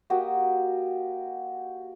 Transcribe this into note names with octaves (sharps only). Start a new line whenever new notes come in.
A#3 F#4 G4 D#5